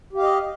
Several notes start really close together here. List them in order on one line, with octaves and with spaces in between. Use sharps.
G4 F5 D#5